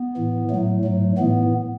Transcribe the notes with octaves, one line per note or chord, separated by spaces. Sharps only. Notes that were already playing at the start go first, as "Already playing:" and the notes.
Already playing: B3
A2 E3
F#3 A3
A2
G#2 F#3
A2 E3 B3